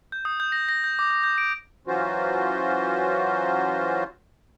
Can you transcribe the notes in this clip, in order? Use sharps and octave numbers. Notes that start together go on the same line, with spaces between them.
G6
D#6
G6
A#6
A#6
G6
D6
D6
G6
D7
E3 F#3 C#4 F4 F#4 C5